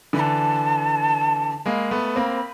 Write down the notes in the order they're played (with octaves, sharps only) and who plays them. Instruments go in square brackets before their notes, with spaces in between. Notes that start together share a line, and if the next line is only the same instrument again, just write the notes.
[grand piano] D3 E3 [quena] B5
[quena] A5
[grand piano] G#3 A#3 [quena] B5
[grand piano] A3 B3
A#3 C4